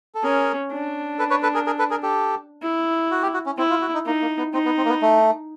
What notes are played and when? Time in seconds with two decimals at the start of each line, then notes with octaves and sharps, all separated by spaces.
0.15 A4
0.23 C#4 G#4 A#4
0.71 D4
1.19 A4 B4
1.30 B4 C#5
1.43 A4 B4
1.54 G#4 A#4
1.66 G#4 A#4
1.79 A4 B4
1.90 G#4 A#4
2.03 G4 A4
2.62 E4
3.11 F#4
3.23 G4
3.34 F#4
3.46 C#4
3.58 C4 E4
3.70 F4
3.82 F#4
3.94 D#4
4.06 A#3 D#4
4.21 A#3
4.38 B3
4.54 C4 D#4
4.65 B3
4.77 C4
4.85 A#3
4.89 B3
5.02 A3